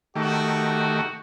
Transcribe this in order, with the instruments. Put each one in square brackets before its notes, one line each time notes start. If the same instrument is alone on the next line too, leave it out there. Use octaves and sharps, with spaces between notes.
[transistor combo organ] D#3 A3 G4 [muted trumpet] F#4